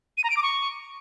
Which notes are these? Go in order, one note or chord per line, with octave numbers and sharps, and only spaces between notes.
D#7
A#5
D7
D6
C#6